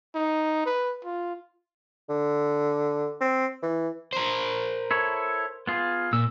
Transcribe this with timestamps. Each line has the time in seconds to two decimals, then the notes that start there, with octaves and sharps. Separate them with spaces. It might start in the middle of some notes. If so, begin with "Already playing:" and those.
0.15 D#4
0.66 B4
1.05 F4
2.09 D3
3.21 C4
3.63 E3
4.13 A#4 C5
4.91 E4 A4 C#5
5.67 B3 F4 G#4
6.13 A#2 E6